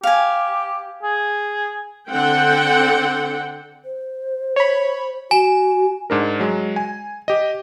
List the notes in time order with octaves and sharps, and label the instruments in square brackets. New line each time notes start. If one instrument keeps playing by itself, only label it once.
[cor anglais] G4 [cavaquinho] F5 G#5
[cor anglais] G#4
[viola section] D3 C4 F#5 G5
[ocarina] C5
[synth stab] C#5 B5
[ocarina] F#4 [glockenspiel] G#5 [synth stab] E7
[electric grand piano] G#2 D4 A#4
F#3 G#3
G#5
G4 D#5